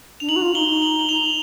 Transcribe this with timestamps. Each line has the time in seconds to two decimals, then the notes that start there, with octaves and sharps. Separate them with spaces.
0.20 D4 F7
0.29 D#4 F#7
0.36 F#4
0.42 F4
0.55 D#4 G7
0.68 D#4
0.82 F#7
0.99 F#7
1.09 F7